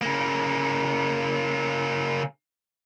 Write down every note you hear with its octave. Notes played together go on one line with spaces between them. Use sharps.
C#3 A#3